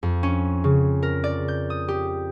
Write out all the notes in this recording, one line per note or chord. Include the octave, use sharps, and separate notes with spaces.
F2
C#4
C#3
A#4
D5
G6
D#6
G4